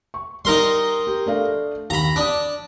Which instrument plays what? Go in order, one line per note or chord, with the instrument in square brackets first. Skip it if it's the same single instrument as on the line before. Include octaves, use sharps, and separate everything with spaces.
[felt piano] C#6
[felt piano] G3 [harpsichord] D#4 A#4 C6
[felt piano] G4
A3 D4 F5
[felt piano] D#2 [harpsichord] A#5 B5
[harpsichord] D4 [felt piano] D6 D#6